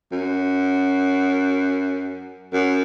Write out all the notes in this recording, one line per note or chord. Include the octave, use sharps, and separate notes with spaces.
F#2
F#2